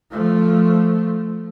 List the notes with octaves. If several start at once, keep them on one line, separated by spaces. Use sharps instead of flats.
F3 A3